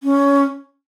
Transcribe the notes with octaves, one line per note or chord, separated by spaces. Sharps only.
C#4